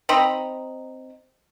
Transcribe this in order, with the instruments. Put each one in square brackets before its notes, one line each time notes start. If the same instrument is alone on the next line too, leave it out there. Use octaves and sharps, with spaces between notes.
[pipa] C4 D#4 A#5 B5